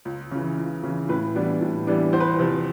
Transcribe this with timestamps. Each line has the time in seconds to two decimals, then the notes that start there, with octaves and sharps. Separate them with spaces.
0.05 C#2
0.31 C#3 E3
0.57 C#2
0.83 C#3 E3
1.09 A2 B4
1.35 E3 G3 B3 D4
1.61 A2
1.87 E3 G3 B3 D4
2.13 E2 C5
2.20 B4
2.27 C5
2.39 C3 F3